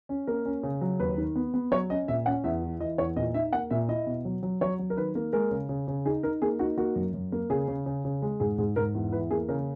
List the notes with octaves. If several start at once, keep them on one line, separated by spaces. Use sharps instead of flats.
C#4
A#3 A#4
C#4
C#3
F#3
D#2 B4
D#3
B3
B3
F#3 C#5
C#4 D#5
A#2 E5
C#4 F#5
E2 E5
E3
E3 D#5
E2 C#5
A#2 D#5
D#4 E5
A#3 F#5
A#2 E5
E4 D#5
B2
F#3
F#3
F#3 C#5
F#3
A#4
D#3 B4
A#3
G#3 A#4
C#3
C#3
C#3
D#4 G#4
D#4 A#4
A#3 G#4
D#4 F#4
A#3 F#4
F#2
F#2
A#3
C#3 G#4
C#3
C#3
C#3
G#3
G#2 G#4
G#2 G#4
G#2 A#4
E2
E3 B4
A#3 G#4
C#3 A#4